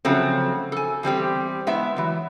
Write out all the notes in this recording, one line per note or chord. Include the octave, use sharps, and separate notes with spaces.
C#3 F3 F#3 A3 C4
A4 G#5
E2 G3 C4 G4
G#3 B3 E4 E5
E3 F#3